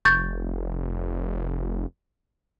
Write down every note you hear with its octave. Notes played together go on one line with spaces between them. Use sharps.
F1 C#6 G6 A6